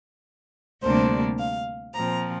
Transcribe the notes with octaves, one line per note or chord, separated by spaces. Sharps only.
D2 C3 G3 A#3 D4 C5
F5
A#2 F3 C4 A#5